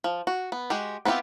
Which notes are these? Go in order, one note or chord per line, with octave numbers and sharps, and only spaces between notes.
F3
F#4
B3
G#3 F#4 G4
B3 C4 E4 F4 G4